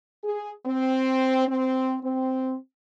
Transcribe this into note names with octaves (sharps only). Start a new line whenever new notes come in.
G#4
C4
C4
C4